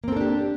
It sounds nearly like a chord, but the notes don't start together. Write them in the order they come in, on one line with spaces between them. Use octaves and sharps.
A#3 C4 A4 D4 G4